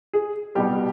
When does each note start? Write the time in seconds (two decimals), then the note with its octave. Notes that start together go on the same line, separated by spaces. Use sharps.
0.13 G#4
0.55 C2 B2 G3 G4